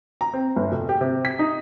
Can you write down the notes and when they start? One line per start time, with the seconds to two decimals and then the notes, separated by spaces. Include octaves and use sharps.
0.21 A#5
0.34 C4
0.56 G1
0.72 F1
0.89 G4
1.01 C3
1.25 B6
1.39 D#4